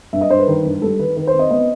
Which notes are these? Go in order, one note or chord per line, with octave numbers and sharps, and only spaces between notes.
G2 E5
D#5
G2 C5
B4
D#3
G2
G3 A4
D#3 B4
D#3 B4
C5
C4
D#5
B3 D#5